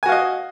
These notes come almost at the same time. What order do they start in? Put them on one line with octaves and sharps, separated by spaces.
G#5 F#4 F5 D#5